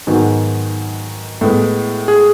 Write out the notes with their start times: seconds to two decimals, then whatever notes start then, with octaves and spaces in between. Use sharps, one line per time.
0.07 G#2 D#3 F#3 B3 F#4
1.41 A2 G#3 B3
2.08 G#4